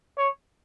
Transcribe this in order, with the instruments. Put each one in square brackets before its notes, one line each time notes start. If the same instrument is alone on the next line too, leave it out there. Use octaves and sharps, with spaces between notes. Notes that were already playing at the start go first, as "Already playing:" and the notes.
[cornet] C#5